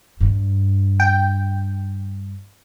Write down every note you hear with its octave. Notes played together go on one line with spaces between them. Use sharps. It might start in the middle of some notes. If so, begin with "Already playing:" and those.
G2
G5